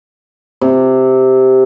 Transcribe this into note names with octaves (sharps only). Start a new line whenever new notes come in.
C3